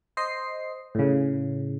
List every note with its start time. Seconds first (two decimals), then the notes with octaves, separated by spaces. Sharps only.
0.17 C5 D#5 C7
0.95 A2 C#3